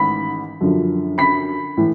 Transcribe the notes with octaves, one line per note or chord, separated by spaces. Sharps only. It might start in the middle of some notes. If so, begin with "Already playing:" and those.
Already playing: A1 G#2 D#3 B5 B6
F#2 D3 F3
B5 B6
A2 E3